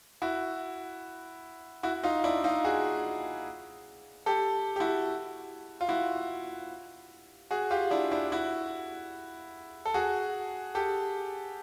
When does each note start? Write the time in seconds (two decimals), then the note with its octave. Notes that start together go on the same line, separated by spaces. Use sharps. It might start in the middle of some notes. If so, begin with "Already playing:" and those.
0.22 E4 F#4
1.83 E4 F#4
2.03 D#4 F4
2.24 D4 E4
2.44 D#4 F4
2.65 F#4 G#4
4.26 G4 A4
4.76 G4
4.80 E4 F#4
5.81 F4
5.89 E4 F#4
7.51 F#4 G#4
7.71 F4 G4
7.91 D4 E4
8.12 D4 E4
8.32 E4 F#4
9.86 A4
9.94 F#4 G#4
10.75 G4 A4